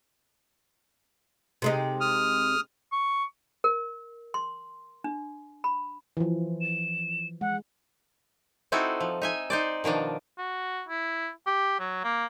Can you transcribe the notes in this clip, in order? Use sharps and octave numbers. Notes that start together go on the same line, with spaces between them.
C3 G#3 D#4
D#6 F6
C#6
A#4
C6
D4
B5
E3 F3
E7
G#3 F#5
C4 D#4 E4 F#4 A4
F3
D#4 E5 G#5
D#4 C5 D5
B2 D#3 F3 D4
F#4
E4
G4
F#3
A#3